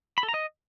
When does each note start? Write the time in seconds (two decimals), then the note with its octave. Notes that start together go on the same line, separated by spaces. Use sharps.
0.18 B5
0.23 A4
0.29 A#5
0.34 D#5